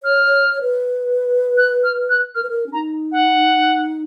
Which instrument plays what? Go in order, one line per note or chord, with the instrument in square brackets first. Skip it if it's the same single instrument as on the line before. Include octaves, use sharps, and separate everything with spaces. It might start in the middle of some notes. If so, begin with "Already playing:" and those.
[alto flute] C#5 [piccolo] F6
[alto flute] C#5
C#5
B4
[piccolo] F#6
F6
F#6
[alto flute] A#4 [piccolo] F6
[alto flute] B4
A#4
C#4
[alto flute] D#4 [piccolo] A#5
[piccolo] F#5